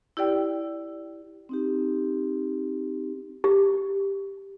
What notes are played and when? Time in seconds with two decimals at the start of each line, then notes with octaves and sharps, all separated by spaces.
0.17 E4 G4 D5 G5
1.49 C4 D#4 G4
3.44 G4